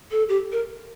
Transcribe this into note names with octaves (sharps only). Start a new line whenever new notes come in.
A4
G4
A#4